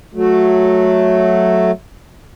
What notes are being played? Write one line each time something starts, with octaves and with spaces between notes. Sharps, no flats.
F#3 A3